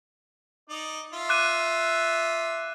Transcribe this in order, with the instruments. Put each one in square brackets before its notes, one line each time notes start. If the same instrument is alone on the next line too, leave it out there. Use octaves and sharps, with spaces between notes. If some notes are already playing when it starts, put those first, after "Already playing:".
[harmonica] D#4 D5
F4 E5
[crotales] D6 F#6 D#7